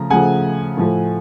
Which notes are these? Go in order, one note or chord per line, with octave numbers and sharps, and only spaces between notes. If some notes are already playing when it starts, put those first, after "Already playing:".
Already playing: C#3 F3 A3 A#5
C#3 F3 A3 F#5 G#5
A2 F3 A3